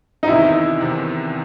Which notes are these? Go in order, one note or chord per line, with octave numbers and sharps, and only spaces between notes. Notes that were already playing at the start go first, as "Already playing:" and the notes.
D#4
E2 C3 D#3 E4
E2 C3 D#3